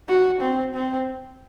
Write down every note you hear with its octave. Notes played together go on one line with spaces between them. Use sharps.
F#4
C4
C4